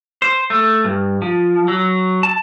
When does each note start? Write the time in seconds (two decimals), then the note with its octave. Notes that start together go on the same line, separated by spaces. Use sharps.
0.22 C5
0.50 A3
0.84 G2
1.22 F3
1.68 F#3
2.23 A5